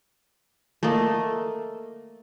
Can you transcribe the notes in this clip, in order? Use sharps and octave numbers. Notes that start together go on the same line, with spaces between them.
A3 A#3 D5 D#5